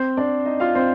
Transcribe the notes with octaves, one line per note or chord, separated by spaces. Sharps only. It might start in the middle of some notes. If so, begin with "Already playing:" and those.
Already playing: C4 C5
D4 D5
D#4 D#5
F4 F5
C4 C5